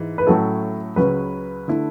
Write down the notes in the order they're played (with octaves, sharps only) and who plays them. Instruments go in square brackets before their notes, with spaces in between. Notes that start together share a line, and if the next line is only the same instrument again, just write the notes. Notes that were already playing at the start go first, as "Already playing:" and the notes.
Already playing: [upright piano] G#2 E3
[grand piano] B4
[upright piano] A2 F#3 A3 C#4 E4 [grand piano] A4
[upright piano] C#2 C#3 F#3 C#4 [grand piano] B4
[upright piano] D3 A3 E4